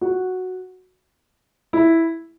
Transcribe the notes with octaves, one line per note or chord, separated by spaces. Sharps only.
F#4
E4